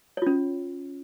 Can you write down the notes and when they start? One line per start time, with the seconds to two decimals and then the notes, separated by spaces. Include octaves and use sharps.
0.17 C#5
0.22 F4
0.27 C#4